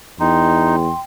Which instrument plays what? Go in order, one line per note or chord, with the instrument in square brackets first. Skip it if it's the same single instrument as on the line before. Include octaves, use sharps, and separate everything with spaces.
[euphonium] E2 [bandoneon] D#4 [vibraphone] G5 [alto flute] C6